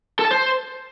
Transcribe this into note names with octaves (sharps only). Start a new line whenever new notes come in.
A4
A5
C5